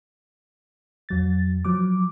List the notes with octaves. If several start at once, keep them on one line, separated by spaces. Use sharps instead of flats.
F2 F#3 A6
F3 F#3 D6